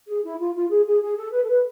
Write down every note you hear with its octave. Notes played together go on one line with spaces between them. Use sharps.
G#4
E4
F4
F4
G#4
G#4
G#4
A4
B4
A4
B4